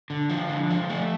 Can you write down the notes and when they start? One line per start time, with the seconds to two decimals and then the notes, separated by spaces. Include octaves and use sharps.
0.10 D3
0.30 F3
0.49 D3
0.70 F3
0.90 A3